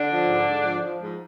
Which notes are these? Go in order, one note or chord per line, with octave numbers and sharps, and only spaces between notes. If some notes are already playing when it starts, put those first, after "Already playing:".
Already playing: D3 D4
F3
G#2
G#2
F3
F3
G#2